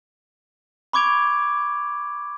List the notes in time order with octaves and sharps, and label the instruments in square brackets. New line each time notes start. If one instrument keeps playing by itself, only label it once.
[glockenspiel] B5 C#6 D6 G#6 D7 F7